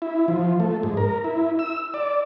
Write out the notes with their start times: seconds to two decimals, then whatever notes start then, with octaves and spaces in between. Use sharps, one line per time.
0.02 E4
0.28 F3
0.60 A3
0.83 G#2
0.97 A#4
1.24 E4
1.59 E6
1.94 D5